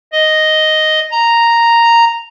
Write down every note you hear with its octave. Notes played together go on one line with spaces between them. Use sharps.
D#5
A#5